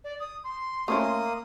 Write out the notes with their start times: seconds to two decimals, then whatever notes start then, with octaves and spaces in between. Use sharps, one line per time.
0.04 D5
0.20 D#6
0.44 C6
0.88 A3 A#3 C#4 E4 D#6